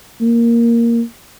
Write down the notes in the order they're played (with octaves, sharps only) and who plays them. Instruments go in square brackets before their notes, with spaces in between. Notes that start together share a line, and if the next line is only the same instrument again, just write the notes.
[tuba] A#3